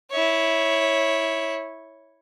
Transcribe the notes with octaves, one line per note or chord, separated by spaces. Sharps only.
E4 C#5